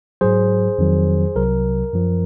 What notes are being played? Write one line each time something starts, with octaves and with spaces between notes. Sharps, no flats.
G#2 F#3 G#4 C5
F2 D#3 F#3
C2 C3 F#3 A#4
F#2 F3